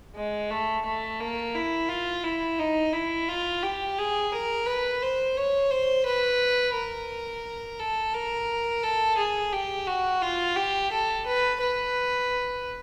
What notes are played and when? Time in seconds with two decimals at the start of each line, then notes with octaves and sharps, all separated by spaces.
0.16 G#3
0.51 A3
0.85 A3
1.20 A#3
1.55 E4
1.89 F4
2.24 E4
2.59 D#4
2.93 E4
3.29 F4
3.63 G4
3.98 G#4
4.32 A#4
4.66 B4
5.02 C5
5.37 C#5
5.71 C5
6.06 B4
6.75 A#4
7.79 A4
8.14 A#4
8.83 A4
9.17 G#4
9.53 G4
9.87 F#4
10.22 F4
10.56 G4
10.91 A4
11.26 B4
11.61 B4